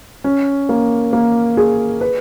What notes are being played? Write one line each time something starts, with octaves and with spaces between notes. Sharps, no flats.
C#4
A#3
A#3
G#4
B4